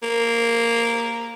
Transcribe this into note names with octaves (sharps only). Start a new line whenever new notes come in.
A#3